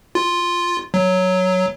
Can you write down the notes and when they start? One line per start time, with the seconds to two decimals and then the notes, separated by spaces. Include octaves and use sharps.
0.15 F4
0.94 F#3